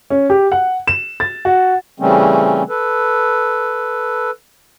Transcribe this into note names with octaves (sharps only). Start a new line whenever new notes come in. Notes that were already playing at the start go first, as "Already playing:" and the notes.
C#4
G4
F#5
E7
A6
F#4
C#3 E3 G3 A3 C4 C#4
A4 B4